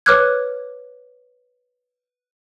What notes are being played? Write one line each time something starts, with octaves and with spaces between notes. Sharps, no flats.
B4 C#5 D6 F6 F#6 G#6